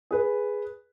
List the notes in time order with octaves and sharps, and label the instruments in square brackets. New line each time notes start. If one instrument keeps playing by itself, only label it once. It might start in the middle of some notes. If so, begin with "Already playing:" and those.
[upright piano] G#4 B4